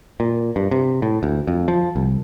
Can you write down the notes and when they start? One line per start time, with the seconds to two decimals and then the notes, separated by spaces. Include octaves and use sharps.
0.20 A#2
0.56 G2
0.71 C3
1.02 A2
1.23 D2
1.47 F2
1.68 F3
1.96 C2